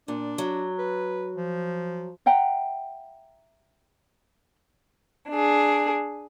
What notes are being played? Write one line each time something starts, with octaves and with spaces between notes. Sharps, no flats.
A#2 D4
F#3
B4
F3
E5 F#5 G5 A#5
D4 G#4